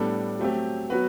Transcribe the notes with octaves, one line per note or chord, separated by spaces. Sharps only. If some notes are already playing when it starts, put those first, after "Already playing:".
Already playing: A2 G3 B3 D4 A4
F#3 A3 C4 G4
F#3 B3 F#4 B4